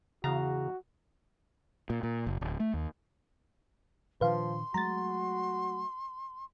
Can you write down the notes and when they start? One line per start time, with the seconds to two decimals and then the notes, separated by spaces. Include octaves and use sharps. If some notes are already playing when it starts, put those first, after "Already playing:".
0.24 E2 C#3 F#4 F5 A#5
1.90 A#2
2.03 A#2
2.27 F#1
2.41 D1
2.60 A3
2.74 D#2
4.21 A#2 D#3 F3 D4 B4 F5 C6
4.74 F#3 G#3 A3 F#4 A#5 A6